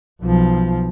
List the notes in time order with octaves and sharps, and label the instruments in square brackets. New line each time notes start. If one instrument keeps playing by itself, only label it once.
[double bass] B1 F3